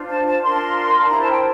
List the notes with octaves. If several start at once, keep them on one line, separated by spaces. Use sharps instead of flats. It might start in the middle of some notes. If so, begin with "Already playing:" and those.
Already playing: D4 F4 C5
A5
A5
D4 F4 A#4 C6
A5
E4 G4 C5 A#5
A5
G5